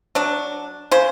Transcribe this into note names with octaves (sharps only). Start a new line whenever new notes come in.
F#3 D4
C#3 C5